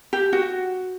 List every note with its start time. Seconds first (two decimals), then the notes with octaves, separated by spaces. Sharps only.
0.13 G4
0.33 F#4